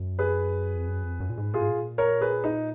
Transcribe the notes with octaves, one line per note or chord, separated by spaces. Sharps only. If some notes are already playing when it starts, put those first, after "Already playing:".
Already playing: F#2
G#4 B4
F2
F#2
F2
F#2
A#2
G#2
A#2 F4 G#4
G#2
A#2
A#4 C#5
G#4 B4
D#4